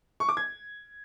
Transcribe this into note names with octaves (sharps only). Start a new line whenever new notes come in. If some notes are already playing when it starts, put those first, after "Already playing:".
C#6
D6
G#6